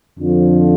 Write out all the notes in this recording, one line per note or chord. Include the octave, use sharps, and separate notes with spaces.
F2 D3 F3